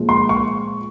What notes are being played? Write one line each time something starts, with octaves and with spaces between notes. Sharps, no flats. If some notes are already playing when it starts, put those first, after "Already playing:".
Already playing: A#2 F3 G#3
C6
C#6